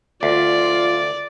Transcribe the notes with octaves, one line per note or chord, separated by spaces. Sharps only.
D2 F4 D5